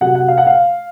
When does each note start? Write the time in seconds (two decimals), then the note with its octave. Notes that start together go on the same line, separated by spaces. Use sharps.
0.01 C3 F#3 F#5
0.15 F#5
0.28 F5
0.38 F#5
0.47 F5